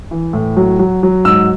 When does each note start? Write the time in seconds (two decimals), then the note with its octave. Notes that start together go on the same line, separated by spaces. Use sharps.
0.11 E3
0.33 A2
0.57 F#3
0.79 F#3
1.03 F#3
1.25 G#2 E6